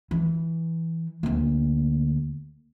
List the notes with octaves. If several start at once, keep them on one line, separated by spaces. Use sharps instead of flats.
E3
D2 A#3